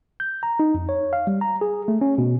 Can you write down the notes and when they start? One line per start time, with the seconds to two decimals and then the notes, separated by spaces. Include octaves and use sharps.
0.20 G6
0.43 A#5
0.60 D#4
0.74 F2
0.89 C#5
1.13 F5
1.27 G3
1.41 A#5
1.61 G#4
1.88 A3
2.01 C#4
2.18 B2